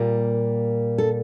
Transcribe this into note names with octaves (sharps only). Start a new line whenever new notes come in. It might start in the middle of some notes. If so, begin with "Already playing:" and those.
Already playing: A#2 G3 A#3 F4 A#4
A4